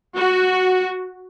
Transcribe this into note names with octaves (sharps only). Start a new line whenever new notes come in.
F#4